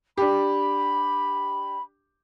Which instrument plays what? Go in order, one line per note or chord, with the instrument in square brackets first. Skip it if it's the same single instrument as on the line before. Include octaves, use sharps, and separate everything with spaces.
[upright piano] D4 G4 [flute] B5